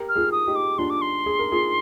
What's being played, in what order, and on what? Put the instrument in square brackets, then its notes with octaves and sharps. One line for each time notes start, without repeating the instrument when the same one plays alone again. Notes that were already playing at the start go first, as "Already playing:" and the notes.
Already playing: [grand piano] G4 A#4
[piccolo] F6
[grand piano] F4 G#4
[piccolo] D#6
[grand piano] D#4 G4
[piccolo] D6
[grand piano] D4 F4 [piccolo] C6
[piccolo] D6
C6
[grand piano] G#4
A#4
F4 G#4